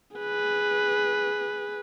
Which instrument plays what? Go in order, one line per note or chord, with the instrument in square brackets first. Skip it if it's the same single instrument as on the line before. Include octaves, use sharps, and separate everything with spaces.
[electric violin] G#4 B4